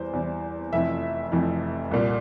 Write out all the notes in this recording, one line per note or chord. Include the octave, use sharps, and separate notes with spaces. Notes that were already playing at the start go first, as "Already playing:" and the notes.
Already playing: E2 E3 G3 C5
E2 E3 G3
F1 F2 E3 E5
F1 F2 E3
C2 A#2 G3